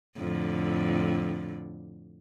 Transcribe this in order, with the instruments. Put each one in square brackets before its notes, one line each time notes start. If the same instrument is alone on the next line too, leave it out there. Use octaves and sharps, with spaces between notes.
[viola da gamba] F2 A2 D3